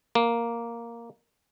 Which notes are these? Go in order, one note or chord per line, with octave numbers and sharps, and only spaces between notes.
A#3